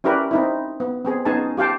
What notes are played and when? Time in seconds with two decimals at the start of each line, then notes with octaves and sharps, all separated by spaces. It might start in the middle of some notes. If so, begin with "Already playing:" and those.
0.04 C#4 E4 G4 A#4 B4 D5
0.31 C4 D#4 E4
0.80 B3
1.05 B3 C4 G#4
1.25 B3 C#4 D#4 G#4 G#5 A5
1.57 F4 G4 F5 G5 A5